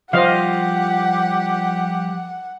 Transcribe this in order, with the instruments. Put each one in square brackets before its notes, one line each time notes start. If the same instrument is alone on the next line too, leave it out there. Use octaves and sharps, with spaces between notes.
[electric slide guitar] F3 G3 F4 [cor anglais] G4 [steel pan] C5 D#5 F5 [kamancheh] F#5